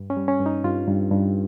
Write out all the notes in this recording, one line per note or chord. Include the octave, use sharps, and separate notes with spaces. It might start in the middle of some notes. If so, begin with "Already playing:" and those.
Already playing: G2
C#4
G3
C#4
G2
D#4
G2 F4
G2
G2